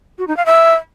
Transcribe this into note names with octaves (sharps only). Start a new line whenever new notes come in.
F#4
D#4
F5
E5